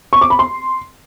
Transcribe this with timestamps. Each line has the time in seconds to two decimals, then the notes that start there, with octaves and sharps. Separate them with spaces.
0.13 C#6
0.21 D6
0.30 B5
0.39 C6